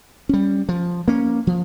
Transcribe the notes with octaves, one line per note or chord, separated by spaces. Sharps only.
G3 C#4
F3
A#3 C#4
F3